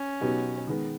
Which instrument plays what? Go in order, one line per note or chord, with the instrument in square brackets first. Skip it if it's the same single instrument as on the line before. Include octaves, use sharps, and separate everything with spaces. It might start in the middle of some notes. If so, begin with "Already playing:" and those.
Already playing: [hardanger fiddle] C#4
[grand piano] B2 F#3 B3 D#4 G4
D#3 G#3 B3